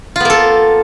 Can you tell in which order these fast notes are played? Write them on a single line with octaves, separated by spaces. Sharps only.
F4 B3 A#3 A4